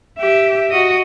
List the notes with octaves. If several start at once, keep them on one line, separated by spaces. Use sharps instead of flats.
G4 E5
F#4 D#5